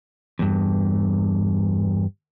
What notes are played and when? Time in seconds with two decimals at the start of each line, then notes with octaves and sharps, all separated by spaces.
0.39 E2 G2